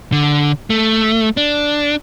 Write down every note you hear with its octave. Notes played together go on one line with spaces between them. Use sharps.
D3
A3
D4